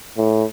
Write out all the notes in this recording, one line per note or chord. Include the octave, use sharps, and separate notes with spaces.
A2